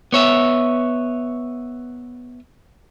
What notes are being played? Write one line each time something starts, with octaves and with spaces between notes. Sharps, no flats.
B3 C#5 E5